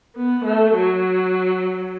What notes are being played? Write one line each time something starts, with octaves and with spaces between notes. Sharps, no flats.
B3
A3
F#3